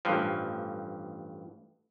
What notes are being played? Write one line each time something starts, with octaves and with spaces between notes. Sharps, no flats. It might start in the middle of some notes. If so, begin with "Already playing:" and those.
A1 G2 F3